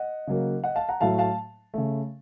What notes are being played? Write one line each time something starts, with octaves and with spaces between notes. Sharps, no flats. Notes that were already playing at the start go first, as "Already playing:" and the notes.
Already playing: D#5 F#5
C#3 F#3 A#3
D#5 F#5
F5 A5
F#5 A#5
A2 F#3 A3 F5 A5
F5 A5
C#3 A3